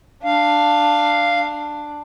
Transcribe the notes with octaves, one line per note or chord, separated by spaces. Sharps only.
D4 F5